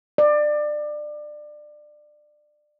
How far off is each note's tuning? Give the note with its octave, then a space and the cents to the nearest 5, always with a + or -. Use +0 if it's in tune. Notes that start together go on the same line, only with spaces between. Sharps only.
D5 +25